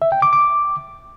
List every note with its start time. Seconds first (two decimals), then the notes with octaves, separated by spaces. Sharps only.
0.02 E5
0.12 G5
0.22 D6
0.33 D6